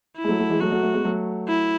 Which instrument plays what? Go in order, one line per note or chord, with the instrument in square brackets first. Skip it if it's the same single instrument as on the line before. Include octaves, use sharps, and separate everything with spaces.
[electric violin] E4
[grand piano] G#3
F#3 A3
F#3 A3
E3 G#3
[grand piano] F#3 A3 [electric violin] F#4
[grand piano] F#3 A3
F#3 A3
G#3 B3
F#3 A3
[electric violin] E4